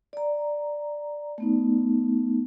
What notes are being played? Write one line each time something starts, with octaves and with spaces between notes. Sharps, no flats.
D5 A#5
A3 B3 D#4